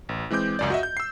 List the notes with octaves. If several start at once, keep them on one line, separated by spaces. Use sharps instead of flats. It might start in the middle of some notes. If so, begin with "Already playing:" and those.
A1
E3 G#3 C4 D6 G6
C#2 F#2 D5
F#4 D#5 E5
G6
E6 C7